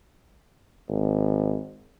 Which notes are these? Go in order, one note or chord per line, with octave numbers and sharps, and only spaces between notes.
G#1